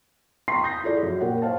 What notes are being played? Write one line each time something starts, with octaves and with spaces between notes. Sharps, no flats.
G5 A#5 C6 C#6 B6 C7
D#6 G6 A#6
E4 F4 G#4 A4 C#5 D5
F#2
A#2 G4 A#4 C#5 F#5
A#4 C5 C#5 F5 A5